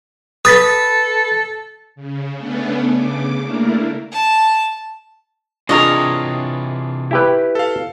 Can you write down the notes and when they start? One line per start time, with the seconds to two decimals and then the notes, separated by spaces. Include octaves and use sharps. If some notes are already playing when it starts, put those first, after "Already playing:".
0.45 A4 B4 D#6 A6 B6
1.96 C#3
2.37 A3 B3 C#4 D4
2.92 C#3 D6
3.42 A3 A#3 D4 E4 A#4
4.12 A5
5.69 C3 E3 D4 F4 G#4 A#4 C#5 D#5
7.11 E4 G4 B4
7.55 A4 F5